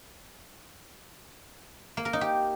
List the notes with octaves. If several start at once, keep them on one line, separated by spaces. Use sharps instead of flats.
A#3
A#4
D#4
G4